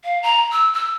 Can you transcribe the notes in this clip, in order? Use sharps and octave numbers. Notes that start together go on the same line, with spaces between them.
F5
A#5
E6
E6